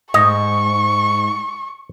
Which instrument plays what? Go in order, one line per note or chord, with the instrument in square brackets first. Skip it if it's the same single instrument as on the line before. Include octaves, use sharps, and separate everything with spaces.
[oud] G#2 [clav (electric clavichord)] D#5 [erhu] C#6